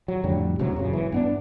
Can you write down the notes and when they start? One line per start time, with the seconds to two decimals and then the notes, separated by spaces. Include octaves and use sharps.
0.08 F#3
0.24 F2 A2 D3 G3
0.59 E1 D2 C3 F#3
0.76 F#2 A#2 C#3
0.93 G#1 E3
1.12 G2 B3 D4